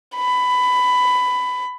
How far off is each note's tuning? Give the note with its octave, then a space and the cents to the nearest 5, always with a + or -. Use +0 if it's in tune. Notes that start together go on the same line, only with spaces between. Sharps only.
B5 +15